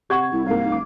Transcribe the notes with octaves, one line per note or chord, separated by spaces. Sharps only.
C3 G4 F#5 C#6 G#6
C2 E4
G#2 A#3 F5
F#1 D6